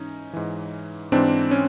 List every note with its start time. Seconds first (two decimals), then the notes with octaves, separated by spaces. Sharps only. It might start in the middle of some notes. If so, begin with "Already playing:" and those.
Already playing: G#2 E3 C#4 D#4
0.33 G#2 E3
1.12 G#2 E3 C4 D4
1.51 C#4